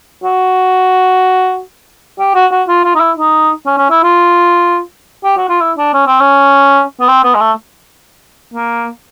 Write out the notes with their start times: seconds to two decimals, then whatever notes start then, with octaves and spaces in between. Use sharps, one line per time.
0.24 F#4
2.19 G4
2.35 F#4
2.52 F#4
2.68 F4
2.84 F4
2.95 D#4
3.00 E4
3.17 D#4
3.66 C#4
3.78 C#4
3.90 E4
4.03 F4
5.24 G4
5.37 F#4
5.49 F4
5.61 E4
5.78 D4
5.94 C#4
6.07 C4
6.20 C#4
7.00 B3
7.08 C4
7.24 B3
7.35 G#3
7.41 A3
8.54 A#3